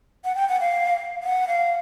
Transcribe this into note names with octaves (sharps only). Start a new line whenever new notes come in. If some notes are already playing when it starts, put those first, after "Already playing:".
F#5
G5
F#5
F5
F#5
F5